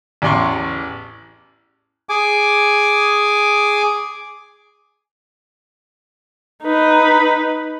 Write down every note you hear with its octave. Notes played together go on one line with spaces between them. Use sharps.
A1 E2 D5 C6 C#6
G#4 G#5 D6
D#4 B4